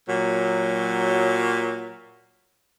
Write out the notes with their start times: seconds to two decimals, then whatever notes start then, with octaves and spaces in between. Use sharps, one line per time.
0.08 A#2 F#3